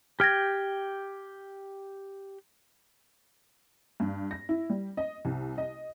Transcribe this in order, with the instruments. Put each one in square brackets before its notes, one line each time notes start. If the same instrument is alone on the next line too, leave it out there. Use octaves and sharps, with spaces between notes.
[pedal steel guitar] G4 G5 [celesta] F6 G#6 A#6
[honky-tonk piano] G2
A#6
E4
G3
D#5
C2
D#5